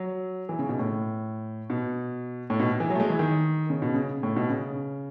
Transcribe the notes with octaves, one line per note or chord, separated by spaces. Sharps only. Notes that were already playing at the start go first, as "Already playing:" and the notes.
Already playing: F#3
E3
C#3
B2
A2
B2
A2
B2
E3
F#3
A3
G#3
E3
D#3
C#3
B2
C#3
A2
B2
C#3